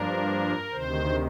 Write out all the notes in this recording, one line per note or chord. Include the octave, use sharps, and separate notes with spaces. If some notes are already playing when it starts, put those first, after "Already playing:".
Already playing: G2 F3 A#3 D4 A#4
D2 C3 D#3 C5